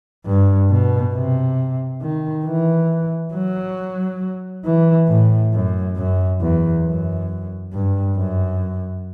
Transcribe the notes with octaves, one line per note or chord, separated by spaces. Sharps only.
G2
B2
C3
D#3
E3
F#3
E3
A2
F#2
F#2
E2
F#2
G2
F#2